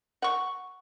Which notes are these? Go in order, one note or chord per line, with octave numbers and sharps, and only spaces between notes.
F#5 C#6